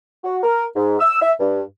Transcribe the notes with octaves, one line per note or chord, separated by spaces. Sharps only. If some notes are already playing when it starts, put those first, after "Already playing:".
F#4
A#4
G#2
E6
E5
G2